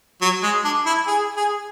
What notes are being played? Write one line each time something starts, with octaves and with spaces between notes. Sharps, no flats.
F#3
G#3
D4
E4
G#4
G#4